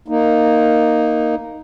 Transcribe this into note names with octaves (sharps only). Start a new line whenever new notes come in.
A#3 D#4